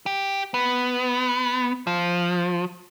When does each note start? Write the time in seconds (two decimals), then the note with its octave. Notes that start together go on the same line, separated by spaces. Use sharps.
0.06 G4
0.54 B3
1.87 F3